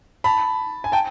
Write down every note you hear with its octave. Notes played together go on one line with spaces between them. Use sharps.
A5 B5
G#5
G5 A5